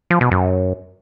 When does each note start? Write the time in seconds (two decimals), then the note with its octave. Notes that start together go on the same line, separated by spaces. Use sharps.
0.10 F3
0.21 B2
0.31 F#2